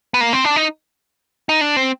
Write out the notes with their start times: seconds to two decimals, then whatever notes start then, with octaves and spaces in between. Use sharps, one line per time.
0.14 B3
0.21 A#3
0.33 C4
0.45 D4
0.56 D#4
1.49 D#4
1.61 D4
1.76 C4